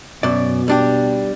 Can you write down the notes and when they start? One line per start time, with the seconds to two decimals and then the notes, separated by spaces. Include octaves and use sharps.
0.23 F#2 B2 D5
0.68 G3 D4 G4